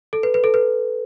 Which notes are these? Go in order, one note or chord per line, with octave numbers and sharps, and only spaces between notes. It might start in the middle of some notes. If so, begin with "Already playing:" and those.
A4
B4
B4
A4
B4